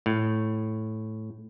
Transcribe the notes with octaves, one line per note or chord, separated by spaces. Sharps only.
A2